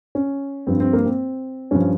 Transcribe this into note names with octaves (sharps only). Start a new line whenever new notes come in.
C#4
G2 F3 C4
C4
A#3
C4
G2 F3 C#4